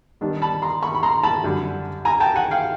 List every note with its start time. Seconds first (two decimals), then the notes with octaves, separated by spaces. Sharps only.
0.21 D#3 G3 B3 D4
0.42 A5 B5
0.62 A#5 C6
0.83 B5 C#6
0.95 B5
1.03 A#5 C6
1.23 A5 B5
1.44 F#2 D3 G3
2.05 G#5 A#5
2.20 G5 A5
2.36 F#5 G#5
2.51 F5 G5